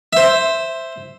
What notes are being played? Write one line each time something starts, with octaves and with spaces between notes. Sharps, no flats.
C5 E5